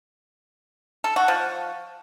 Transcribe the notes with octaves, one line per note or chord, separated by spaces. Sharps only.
A4
F#4
F3